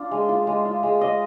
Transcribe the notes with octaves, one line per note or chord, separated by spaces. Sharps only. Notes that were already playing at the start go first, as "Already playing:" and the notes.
Already playing: D4 F4
G#3
F4
G#3
F4
G#3
G#3 D#5